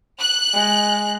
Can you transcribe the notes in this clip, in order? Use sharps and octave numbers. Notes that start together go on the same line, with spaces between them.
F#6
G#3